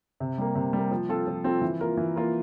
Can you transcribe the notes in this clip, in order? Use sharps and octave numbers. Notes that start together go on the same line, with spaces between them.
C3
G3 A#3
C3
G3 A#3
F3
C4 F4 A4
F3
C4 F4 A4
E3
A#3 F4 A#4
E3
A#3 F4 A#4